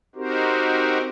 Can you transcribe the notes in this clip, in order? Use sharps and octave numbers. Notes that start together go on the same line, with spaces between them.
C4 D#4 F#4 G4 A#4 C5